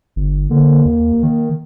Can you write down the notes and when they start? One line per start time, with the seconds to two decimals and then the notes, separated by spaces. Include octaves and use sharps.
0.16 G1
0.51 D3 A#3
0.85 D#2
1.23 D#3